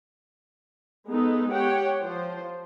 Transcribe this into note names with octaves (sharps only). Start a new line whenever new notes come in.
G#3 B3 D#4 A4 B4
G4 C#5 F#5 G5
F3 C5